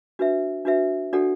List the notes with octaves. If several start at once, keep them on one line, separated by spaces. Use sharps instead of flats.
D4 F#4 B4 E5
D4 F#4 B4 E5
D4 F#4 A4 D5 F#5